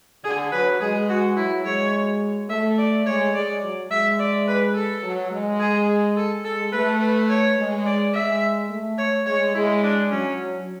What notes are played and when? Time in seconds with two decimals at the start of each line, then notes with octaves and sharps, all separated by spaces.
0.24 D3 G#4
0.52 F#3 B4
0.81 G#3 G#4
1.09 F#4
1.36 F#3 E4
1.65 G#3 C#5
2.50 A3 E5
2.78 D5
3.06 G#3 C#5
3.34 G#3 D5
3.63 F#3
3.91 G#3 E5
4.19 D5
4.48 B4
4.75 A4
5.03 F#3
5.31 G#3
5.60 G#4
6.16 A4
6.44 G#3 A4
6.73 A3 B4
7.01 B4
7.29 C#5
7.58 G#3
7.85 D5
8.14 G#3 E5
8.70 A3
8.98 C#5
9.26 G#3 C#5
9.54 G#3 E4
9.83 D4
10.11 F#3 C#4